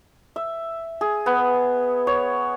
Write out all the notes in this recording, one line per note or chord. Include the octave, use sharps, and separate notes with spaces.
E5
G#4
B3
C#5